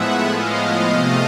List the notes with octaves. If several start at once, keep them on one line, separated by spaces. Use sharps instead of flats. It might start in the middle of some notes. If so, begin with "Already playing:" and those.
Already playing: A2 F3 G#3 B3 E5 F#5
D#5 F5
C3 F3 A3